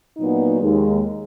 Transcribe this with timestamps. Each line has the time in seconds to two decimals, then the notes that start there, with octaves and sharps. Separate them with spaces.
0.17 A#2 F#3 B3 D#4
0.60 D#2 D#3 G#3